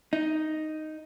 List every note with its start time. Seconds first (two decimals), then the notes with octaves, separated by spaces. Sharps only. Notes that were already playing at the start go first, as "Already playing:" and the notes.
0.13 D#4